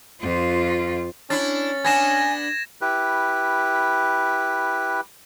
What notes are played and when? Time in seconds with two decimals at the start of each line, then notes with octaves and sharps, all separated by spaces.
0.21 F2 F4
1.30 C#4 D4 E4 A6
1.85 B3 D4 G#5 G#6 A#6 E7
2.81 E4 G4 B4